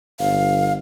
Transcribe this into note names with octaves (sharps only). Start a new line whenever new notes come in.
G1 F5